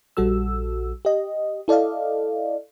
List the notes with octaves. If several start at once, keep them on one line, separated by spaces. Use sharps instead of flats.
A#1 G3 F#4 A4 E6
G4 D#5
E4 A4 D5 D#5 F5